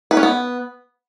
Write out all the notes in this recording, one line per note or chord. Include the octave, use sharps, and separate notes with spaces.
B4
C#4
B3